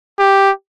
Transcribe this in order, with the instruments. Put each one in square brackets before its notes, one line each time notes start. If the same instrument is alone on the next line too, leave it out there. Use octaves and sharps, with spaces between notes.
[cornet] G4